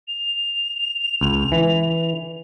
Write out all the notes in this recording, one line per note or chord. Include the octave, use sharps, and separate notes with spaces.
F7
C#2
E3